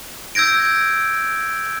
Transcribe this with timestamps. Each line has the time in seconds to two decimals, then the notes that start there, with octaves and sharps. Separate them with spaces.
0.35 E6 G6 G#6 A#6 D7